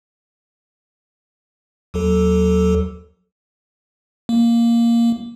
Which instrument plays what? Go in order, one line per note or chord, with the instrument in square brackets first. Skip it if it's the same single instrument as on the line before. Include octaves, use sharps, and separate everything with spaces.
[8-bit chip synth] D#2 F#3 A4
A#3